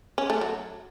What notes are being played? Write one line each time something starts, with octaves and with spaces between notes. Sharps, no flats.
C#4
A3
F#3